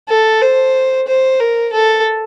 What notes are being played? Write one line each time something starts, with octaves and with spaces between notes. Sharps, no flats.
A4
C5
C5
A#4
A4